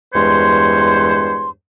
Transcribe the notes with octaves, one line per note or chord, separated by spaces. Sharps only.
E2 G2 G#3 C5 C#5 C6